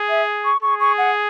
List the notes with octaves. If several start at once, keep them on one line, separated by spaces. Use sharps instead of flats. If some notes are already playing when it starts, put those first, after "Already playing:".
Already playing: G#4
E5
C#6
G#4 C#6
C#6
F#5